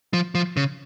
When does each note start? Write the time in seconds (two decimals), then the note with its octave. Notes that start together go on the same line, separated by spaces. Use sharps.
0.13 F3
0.35 F3
0.57 C#3